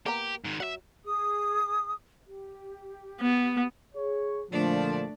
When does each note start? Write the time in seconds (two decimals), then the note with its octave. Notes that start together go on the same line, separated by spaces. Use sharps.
0.06 A#3 B3 G4 A#5
0.45 G#2 D#3
0.60 F#3 E5 F#5
1.05 G#4 D#6
2.27 G4
3.20 B3
3.95 G#4 C#5
4.50 A#2 D3 F3 A3 D4 D5